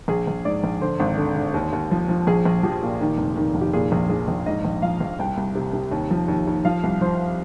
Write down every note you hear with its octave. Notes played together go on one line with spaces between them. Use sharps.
A#1 G#4
A#1
G#2 D5
A#1
D3 C5
G#1
D3
D3
D#2
D#2
F3
F3
A#1 G#4
A#1
F3 G4
A#2
D#3
F1
D#3
F1
G4
A#2 G#4
A#1
F3 G#4
A#1
G#2 D#5
A#1
F3 F5
A#1
C2 G5
C2
C3
C3
D#2
F3
D#2
D#2
F3 F5
C2
F3 C5